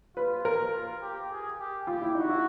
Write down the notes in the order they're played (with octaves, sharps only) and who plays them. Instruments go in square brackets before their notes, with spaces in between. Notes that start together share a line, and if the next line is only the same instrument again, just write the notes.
[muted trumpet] F4 [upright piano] B4
[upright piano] A#4
[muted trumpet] F4
G4
G#4
G4
[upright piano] F4 [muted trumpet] G4
[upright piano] E4
[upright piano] D#4 [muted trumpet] F#4
[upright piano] E4